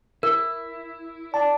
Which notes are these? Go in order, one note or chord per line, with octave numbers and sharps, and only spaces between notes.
E4 A#4
D5 A5